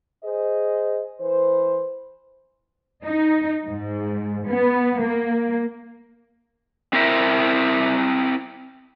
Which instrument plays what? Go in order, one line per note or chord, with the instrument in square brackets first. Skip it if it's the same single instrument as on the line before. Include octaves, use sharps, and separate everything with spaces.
[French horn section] G#4 C5 D#5
E3 B4 C5
[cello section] D#4
G#2
B3
A#3
[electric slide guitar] C4 E4 A#4 E5